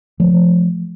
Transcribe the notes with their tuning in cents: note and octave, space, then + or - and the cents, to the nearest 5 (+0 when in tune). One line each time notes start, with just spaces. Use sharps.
F3 +5 A3 -30